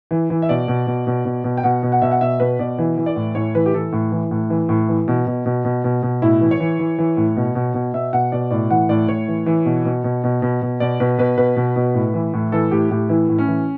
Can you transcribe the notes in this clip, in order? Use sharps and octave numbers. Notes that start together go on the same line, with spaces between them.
E3
E3
E5
B2 D5
B2
B2
B2
B2
B2
G5
B2 F#5
B2
F#5
B2 E5
F#5
B2 E5
B2 B4
B2 D5
E3
E3
D5
A2
A2 C#5
E3 B4
G4
E3 A4
A2
E3
A2
E3
A2
E3
B2
B2
B2
B2
B2
B2
A2 E4
E3
C#5
E3
E3
E3
A2
B2
B2
B2
B2 E5
B2 F#5
B2 D5
A2 D5
E3 F#5
A2 D5
A2 C#5
E3
E3
B2
B2
B2
B2
B2
B2
B2 D5
B2 B4
B2 B4
B2 B4
B2
B2
A2
E3
A2
E3 A4
A2 G4
A2 G4
E3 E4
A2
C#4
E3